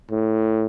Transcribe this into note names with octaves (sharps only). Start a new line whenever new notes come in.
A2